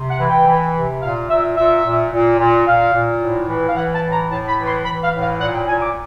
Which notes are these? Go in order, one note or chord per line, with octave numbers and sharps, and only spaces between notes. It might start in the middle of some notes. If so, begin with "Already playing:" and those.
Already playing: C3
F#5
E3
G5
E3
C3
A#2 F5
A#2 E5
A#2 E5
A#2
A#2
A#2
A#2 F5
A#2
A2
E3
F5
E3 F#5
A5
A2
A#5
A2 A5
B5
E3
C6
E3 B5
F5
A2
F5
A#2 F#5
G5
A#2 G#5
D6